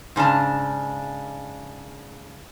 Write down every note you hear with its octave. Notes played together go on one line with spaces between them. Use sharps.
G#2 C#3 D4 A5